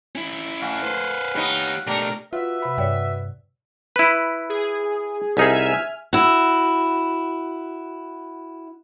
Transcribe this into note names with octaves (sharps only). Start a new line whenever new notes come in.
C#4 E4
A3 F5 F#5 G#5
B4 C5
B3 D#4 G4 B4 C#5
B2 A3 D4 G4 A#4
F4 F#4 B4 E5
C3 B5
G2 C#5 D5 G5
E4 B4
G#4
C2 D#4 G#4 E5 G#5 F6
E4 F#4